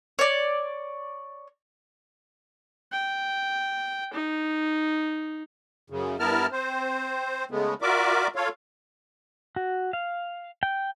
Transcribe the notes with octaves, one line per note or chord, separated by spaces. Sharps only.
C#5 D5
G5
D#4
F#2 C#3
G2 B3 E4 A#4 A5 F6
C4 C5
C#3 G#3 A3 B3
F4 F#4 A#4 D5 E5 D6
F4 A4 C#5 F5
F#4
F5
G5